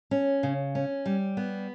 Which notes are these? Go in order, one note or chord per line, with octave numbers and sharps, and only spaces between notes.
C#4
C#3
C#4
G3
B3